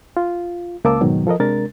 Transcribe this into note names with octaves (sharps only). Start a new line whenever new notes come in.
F4
C#2 A#3 A#4 A5 D6 E6
F2 G#2 B2 D#3 F#3
F3 A4 A#4 D#5
C3 G#3 D4 A#4 A6